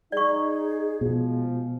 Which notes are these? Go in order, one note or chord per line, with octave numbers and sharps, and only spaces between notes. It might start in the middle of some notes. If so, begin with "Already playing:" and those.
D#4 G#4 D5 C#6
B2 F3 G#3